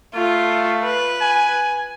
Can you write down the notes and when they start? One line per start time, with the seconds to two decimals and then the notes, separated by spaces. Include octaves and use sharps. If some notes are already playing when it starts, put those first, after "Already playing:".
0.14 A3 F4
0.84 B4
1.21 G#5